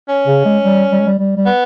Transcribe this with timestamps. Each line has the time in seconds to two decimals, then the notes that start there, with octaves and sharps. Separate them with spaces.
0.09 C#4
0.27 C#3
0.45 G#3
0.64 G3
0.92 G3
1.00 G#3
1.07 G3
1.19 G3
1.37 G3
1.46 B3